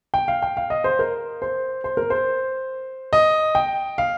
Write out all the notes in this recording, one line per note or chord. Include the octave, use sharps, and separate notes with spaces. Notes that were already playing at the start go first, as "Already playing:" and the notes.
G5
F5
G5
F5
D#5
C5
A#4
C5
C5
A#4
C5
D#5
G5
F5